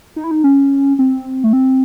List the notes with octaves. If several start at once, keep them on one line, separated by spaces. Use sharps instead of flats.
D#4
E4
D#4
C#4
C4
A3
C4